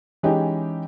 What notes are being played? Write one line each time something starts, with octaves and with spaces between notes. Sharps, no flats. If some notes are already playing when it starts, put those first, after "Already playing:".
E3 G#3 C#4 D#4 G4